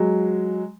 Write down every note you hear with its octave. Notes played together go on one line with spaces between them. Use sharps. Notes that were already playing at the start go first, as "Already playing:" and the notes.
Already playing: F#3 G#3